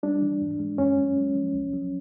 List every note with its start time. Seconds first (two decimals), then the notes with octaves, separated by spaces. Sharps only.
0.03 G3 D4
0.22 E3
0.42 G#2
0.60 G#3
0.78 F#2 C#4
0.98 F#3
1.17 G#3
1.35 F3
1.54 C2
1.73 F#3